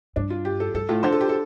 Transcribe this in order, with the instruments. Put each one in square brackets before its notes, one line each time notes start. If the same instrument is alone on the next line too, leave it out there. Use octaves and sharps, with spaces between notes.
[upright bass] G2 [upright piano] D4
[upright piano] F4
G4
A4
[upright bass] G2 [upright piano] A4
[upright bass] A2 [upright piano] F4
[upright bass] D3 [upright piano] C5
[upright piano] A4
G4
A4